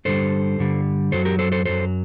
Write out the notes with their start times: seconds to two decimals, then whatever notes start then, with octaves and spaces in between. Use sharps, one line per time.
0.05 G2 D3 G3 A4 C5
0.59 G2 D3 G3
1.12 F#2 F#3 A4 C5
1.25 G4 A#4
1.39 A4 C5
1.52 A4 C5
1.65 F#2 F#3 A4 C5